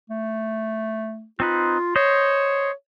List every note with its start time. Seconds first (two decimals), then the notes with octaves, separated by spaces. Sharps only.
0.10 A3
1.40 C4 D#4 F4 B4
1.96 C5 C#5 D#5